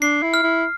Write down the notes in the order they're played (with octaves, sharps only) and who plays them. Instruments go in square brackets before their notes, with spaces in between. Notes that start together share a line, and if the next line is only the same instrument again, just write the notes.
[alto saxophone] D4 [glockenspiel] C7
[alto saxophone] E4
[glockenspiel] F6
[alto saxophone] E4